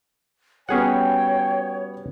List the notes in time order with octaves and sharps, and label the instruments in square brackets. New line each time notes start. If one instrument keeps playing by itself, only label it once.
[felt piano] G3 B3 F#4 [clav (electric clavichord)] C#4 G#4 F#5 [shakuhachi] C#5 [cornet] G5